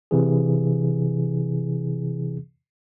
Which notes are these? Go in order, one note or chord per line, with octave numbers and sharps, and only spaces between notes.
C3 E3 G#4